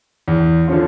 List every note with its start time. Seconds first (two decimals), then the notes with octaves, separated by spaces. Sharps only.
0.28 E2
0.67 D3 F3 C#4 F4